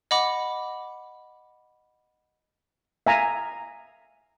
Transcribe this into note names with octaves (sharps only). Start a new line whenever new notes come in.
D#5 F#5 B5 D6
E5 F5 G#5 A#5